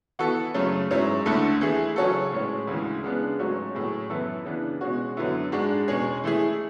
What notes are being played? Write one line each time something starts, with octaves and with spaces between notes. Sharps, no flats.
E3 B3 F#4 A4
F#2 C#3 F#3 A3
G#2 F#3 C#4 E4
D2 D3 A3 E4 A4
E3 A3 E4 G#4
C#3 F#3 C#4 F#4 A4
A2 G#3 C#4
D2 C#3 E3 G#3
C#3 G#3 B3 D4
G#2 F#3 A3 C#4 F#4
A2 F#3 C#4 G#4
F#2 E3 B3 E4 A4
C#3 E3 B3 D4
B2 G#3 C#4 F#4
F#2 D3 F#3 B3 E4
G#2 G#3 D4 F#4
E2 B2 G#3 C#4 G#4
E3 A3 E4 G#4